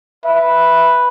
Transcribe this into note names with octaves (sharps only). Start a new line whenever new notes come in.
B4 E5